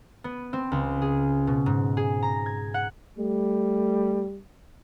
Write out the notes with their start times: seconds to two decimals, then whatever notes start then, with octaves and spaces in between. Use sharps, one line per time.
0.24 B3
0.53 C4
0.72 C#2
1.02 G#4
1.47 B2
1.66 G#2
1.97 G#4
2.22 A#5
2.46 G#6
2.74 F#5
3.19 G3 A3